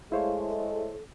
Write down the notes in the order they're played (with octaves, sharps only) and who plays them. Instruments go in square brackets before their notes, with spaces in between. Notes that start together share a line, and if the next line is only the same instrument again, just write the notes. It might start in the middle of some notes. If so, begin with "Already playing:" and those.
[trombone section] G#3 A3 [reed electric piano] E4 C5 C#5 [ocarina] F5
[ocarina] A4